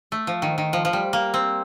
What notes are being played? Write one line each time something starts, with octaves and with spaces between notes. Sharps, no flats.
A3
F3
D#3
D#3
F3
F3
G3
A#3
C4